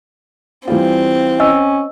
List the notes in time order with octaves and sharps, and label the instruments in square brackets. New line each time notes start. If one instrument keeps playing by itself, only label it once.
[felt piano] E3 G3 F4 [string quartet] C4
[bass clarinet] C#4 [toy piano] D#5 E6